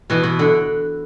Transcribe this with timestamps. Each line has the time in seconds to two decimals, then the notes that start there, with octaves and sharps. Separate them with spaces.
0.10 B2 E3
0.23 B2
0.39 D3